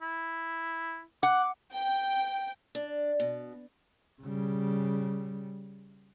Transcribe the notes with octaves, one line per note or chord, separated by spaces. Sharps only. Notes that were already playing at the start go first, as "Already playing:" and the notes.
E4
F#5 D6
G5
D4
B2
C#3 G3